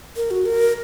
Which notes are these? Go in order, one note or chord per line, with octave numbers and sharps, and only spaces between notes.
A#4
F#4
A#4